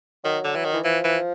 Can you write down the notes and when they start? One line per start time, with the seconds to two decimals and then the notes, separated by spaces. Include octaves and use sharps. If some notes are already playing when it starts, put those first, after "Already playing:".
0.24 D#3 F#3
0.44 D3
0.56 E3
0.65 D#3
0.74 E3
0.84 E3 F3
1.04 E3